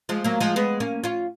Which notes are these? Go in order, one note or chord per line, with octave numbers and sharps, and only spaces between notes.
F3 G#3
F#3 A#3
F3 G#3
G#3 B3
A#3 C#4
C#4 F4